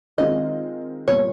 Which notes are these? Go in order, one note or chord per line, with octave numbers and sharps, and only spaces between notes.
D#3 G#3 C4 F4 D#5
A#2 G3 B3 C#5